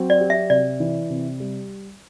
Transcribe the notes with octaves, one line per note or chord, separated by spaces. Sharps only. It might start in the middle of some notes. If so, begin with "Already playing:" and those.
Already playing: F#3 C4
D5
G4
E5
C3 D5
E3
C3
G3